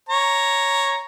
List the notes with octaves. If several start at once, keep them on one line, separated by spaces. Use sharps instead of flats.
C#5 A#5